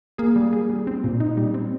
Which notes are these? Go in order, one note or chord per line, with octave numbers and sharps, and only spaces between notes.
A#3 G#4
G3
G#4
G3
C4
A#2
D#4
G3
C4